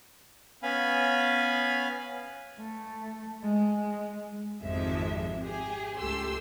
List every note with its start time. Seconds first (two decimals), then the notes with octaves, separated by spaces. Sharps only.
0.63 B3 C#4 F5 G#5 B5
2.59 A3
3.44 G#3
4.63 G#1 F2 C3 F3 G#3 E5
5.41 G4 G#4
5.98 C#2 A3 G4 C6 E6